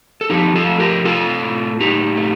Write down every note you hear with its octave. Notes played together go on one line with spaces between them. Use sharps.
A4
F3 D#4 G4
F4 A4
A3
G4 A#4
A3 F4 A4
A2
A2 D#4 G4
A3